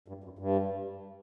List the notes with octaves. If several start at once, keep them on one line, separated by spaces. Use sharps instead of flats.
G2
F#2
G2